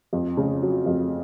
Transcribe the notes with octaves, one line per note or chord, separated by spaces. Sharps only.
F2
C#3
F#3
F2